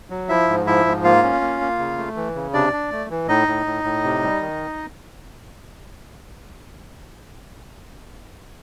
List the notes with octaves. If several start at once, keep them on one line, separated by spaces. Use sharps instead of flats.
F#3
F3 E4 E5
G#2
F3 E4 E5
G#2
A#3 F4 F5
C#4
A#3
A#3
C#3
A3
E3
C#3
C3 D4 D5
D4
A3
E3
A2 D#4 D#5
A2
A2
A2
C3
G3
D#3